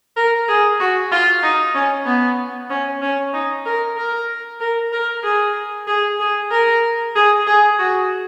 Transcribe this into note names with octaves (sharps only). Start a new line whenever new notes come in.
A#4
G#4
F#4
F4
D#4
C#4
B3
C#4
C#4
D#4
A#4
A#4
A#4
A#4
G#4
G#4
G#4
A#4
G#4
G#4
F#4